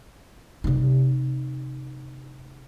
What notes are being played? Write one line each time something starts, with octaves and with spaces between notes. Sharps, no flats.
C3 D#4